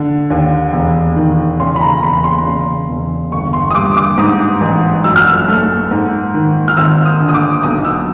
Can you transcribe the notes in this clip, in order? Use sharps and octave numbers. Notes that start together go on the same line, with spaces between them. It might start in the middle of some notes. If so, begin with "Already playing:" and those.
Already playing: D3
D#2
E1
D#3
C#3 C6
B5
A#5
E1 B5
C6
C#3
E1
G1 C#6
C6
D#6
G2 D6
D6
G#2 D#6
A1
F#2 E6
F6
E6
A3
G#2
D#3
F6
G#1 E6
D#6
D3
D#6
D6
B1 D#6
E6